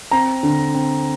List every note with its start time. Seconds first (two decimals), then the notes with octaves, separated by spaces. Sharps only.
0.11 C4 A#5
0.43 D3
0.74 C4